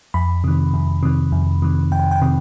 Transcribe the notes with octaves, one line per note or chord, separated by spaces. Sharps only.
F2 B5
C3 D#3
F2
C3 D#3
F2
C3 D#3
F2 G5
G5
C3 D#3